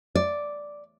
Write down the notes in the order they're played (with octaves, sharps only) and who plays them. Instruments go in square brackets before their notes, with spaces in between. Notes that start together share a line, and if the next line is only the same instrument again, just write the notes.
[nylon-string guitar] D5